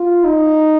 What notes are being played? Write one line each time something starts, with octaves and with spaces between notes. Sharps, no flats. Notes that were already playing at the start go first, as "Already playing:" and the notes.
Already playing: F4
D#4